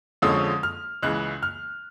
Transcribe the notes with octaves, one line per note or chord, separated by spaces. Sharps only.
F2 D3 F3 G#3 C#4 D#6
F6
C#2 C#3 E3 G#3 F#6
F6